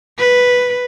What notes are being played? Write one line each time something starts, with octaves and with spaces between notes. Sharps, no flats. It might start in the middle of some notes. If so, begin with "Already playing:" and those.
B4